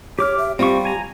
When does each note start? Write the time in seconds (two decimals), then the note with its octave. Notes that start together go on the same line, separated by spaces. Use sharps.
0.19 G4 C#5 D6 F6
0.38 E5
0.59 G3 C4 F4 G4 C#6
0.85 G#5 A#5